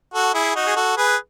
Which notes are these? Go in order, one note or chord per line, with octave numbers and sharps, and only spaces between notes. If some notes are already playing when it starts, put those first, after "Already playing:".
F#4 A4
E4 G#4
D#4 F#4
G#4
F#4 A4
G#4 B4